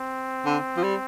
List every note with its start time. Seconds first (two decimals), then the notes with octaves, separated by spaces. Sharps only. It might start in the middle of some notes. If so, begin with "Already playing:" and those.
Already playing: C4
0.46 D3
0.77 F3
0.83 G3